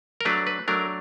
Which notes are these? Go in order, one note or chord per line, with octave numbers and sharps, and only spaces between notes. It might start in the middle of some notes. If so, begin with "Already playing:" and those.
A#4
F#3 A3 D4 B4
B4
F#3 A3 D4 A#4